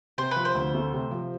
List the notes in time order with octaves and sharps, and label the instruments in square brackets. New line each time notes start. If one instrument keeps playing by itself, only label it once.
[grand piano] C3 [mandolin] C5
[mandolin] B4
[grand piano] F3
[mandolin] C5
[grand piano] D2
A3
C3
F3